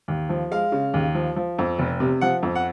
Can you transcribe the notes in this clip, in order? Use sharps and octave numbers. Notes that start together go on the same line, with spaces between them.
D#2
F3
G#3 F5
C#3
D#2
F3
F3
F2
F1
C3
F3 F#5
F2
F#5